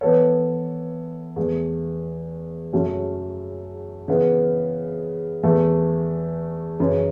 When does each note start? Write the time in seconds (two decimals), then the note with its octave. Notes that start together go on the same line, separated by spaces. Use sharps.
0.01 E3 B3 A4 C#5
1.36 E2 E3 A3
2.73 F#2 C#3 F#3 A3 C#4
4.08 C#3 E3 B3 E4
5.43 E2 E3 A3
6.79 F#2 C#3 E3